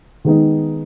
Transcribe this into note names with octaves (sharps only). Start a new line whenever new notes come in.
D#3 G#3 B3 D#4